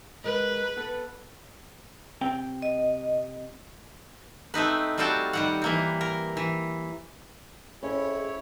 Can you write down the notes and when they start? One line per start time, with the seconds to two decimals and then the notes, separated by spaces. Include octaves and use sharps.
0.24 G#3 A#4 B4 D#5
0.77 B3 A4
2.21 C3 C4 G5
2.62 D#5
4.54 A3 C4 D#4 B4
4.98 G3 C4 F4 F#4 G5 A5
5.33 D#3 G3 F#5
5.62 E3 A#3 C4
6.01 A#4
6.37 E3
7.83 F2 C#4 E4 G#4 C#5